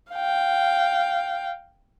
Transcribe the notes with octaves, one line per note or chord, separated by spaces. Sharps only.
F5 G5